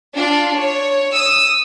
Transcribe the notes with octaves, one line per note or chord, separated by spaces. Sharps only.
D4 F4
C#5
D#6 E6